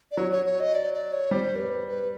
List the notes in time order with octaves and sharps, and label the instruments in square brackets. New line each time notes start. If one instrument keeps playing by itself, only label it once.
[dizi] D5
[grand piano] F#3 [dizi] C#5
[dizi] C#5
C#5
D#5
D5
D5
C#5
[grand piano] G3 [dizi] C5
[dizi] A#4
B4
B4